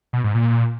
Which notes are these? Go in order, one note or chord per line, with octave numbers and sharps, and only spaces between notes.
B2
G#2
A#2